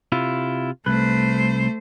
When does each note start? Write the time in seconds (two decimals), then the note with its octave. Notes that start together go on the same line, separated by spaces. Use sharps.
0.12 C3 E4 F4
0.86 C2 A3 B4 C5